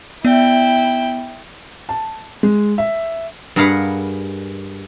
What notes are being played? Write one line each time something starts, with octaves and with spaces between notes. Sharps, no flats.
B3 E4 D5 E5 G5
A5
G#3
E5
G2 G#4 A#4 F5 F#5 B5